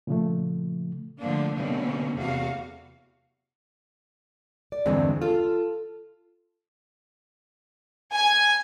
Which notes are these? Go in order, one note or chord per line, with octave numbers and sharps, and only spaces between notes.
A#2 C#3 F3 A3
D3 F3 A3 A#3 D4
B2 D3 F#3 A#3 C4 C#4
E2 C3 A3 F#4 F5
D5
E2 G2 D3 E3 G#3 C4
F4 A4
G#5